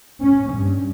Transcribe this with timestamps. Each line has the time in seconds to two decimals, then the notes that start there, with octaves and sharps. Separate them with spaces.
0.21 C#4
0.53 G2